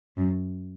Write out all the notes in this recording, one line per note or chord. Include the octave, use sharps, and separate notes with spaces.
F#2